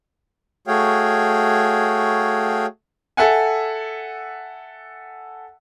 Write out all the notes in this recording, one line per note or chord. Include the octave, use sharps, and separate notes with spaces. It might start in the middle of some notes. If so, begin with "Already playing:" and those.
A3 F#4 G#4 C#5 F5 G5
A4 E5 F#5 G#5